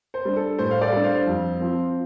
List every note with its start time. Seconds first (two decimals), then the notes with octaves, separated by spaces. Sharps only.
0.14 C5
0.25 G3 D4
0.36 A4
0.58 A2 C5
0.71 F5
0.81 A4 D5
0.92 G3 D4
1.03 C5 F5
1.26 F2
1.60 F3 C4